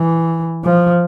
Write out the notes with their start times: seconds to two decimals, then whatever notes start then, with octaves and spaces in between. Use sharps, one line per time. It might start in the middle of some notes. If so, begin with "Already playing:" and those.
Already playing: E3
0.65 F3